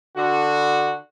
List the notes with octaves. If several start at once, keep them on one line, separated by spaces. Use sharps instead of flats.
D3 F#4